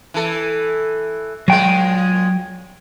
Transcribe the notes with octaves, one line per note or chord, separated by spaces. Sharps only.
E3 A4
A#2 F#3 G#3 G5